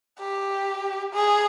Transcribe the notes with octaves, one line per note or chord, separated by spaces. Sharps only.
G4
G#4